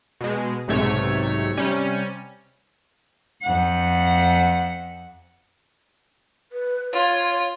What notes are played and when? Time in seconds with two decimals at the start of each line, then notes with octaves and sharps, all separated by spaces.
0.21 B2 G#3
0.68 B1 G#2 C3 A3 C#5
1.57 C3 G3 C#4
3.42 F2 F#5
6.52 B4
6.93 F4 C#5